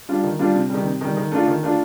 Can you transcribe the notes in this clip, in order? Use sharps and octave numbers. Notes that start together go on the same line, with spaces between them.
G3 D4 F4
D#3
G3 D4 F4
C3
D#3 G3
C3
D#3 G3
D#3
A3 D4 F4
D#3
A3 D4 F4